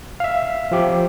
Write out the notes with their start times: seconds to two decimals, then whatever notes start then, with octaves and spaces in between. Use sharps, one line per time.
0.20 E5 F5
0.71 F3 G4